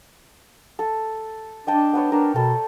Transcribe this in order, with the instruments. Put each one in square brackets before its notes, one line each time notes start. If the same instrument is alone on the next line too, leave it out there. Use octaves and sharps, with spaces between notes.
[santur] A4
[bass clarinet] D4 [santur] D#5 G5 A5
[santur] B3 B4 C#5
[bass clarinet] D4 [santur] A#4
[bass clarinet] B2 [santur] A4 G5